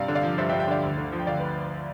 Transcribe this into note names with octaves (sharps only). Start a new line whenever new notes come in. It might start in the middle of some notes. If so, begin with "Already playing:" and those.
Already playing: G2 C3 D5 F5
D3
D5 F5
F3
G2 C5 E5
E5 G5
G2
E5 G5
D3 D5 F5
D2
D3
F3
G5
D2 D5 F5
B4